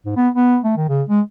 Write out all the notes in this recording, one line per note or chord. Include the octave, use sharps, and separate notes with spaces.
G#2
B3
B3
A3
D#3
C#3
G#3